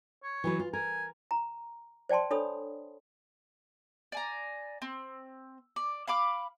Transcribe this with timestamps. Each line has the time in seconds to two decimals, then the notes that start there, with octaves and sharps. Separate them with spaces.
0.23 C#5
0.44 E3 F#3 B4
0.59 F4
0.73 A#4 G#5
1.31 A#5
2.09 C5 D5 G5 A5 C6
2.31 D4 A4 C#5 B5 D#6
4.12 D5 G#5 A#5
4.82 C4
5.76 D5
6.07 F5 B5 D6 F6